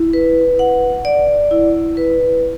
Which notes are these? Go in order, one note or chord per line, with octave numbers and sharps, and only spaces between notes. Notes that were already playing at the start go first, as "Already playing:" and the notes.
Already playing: E4
B4
F#5
D5
E4
B4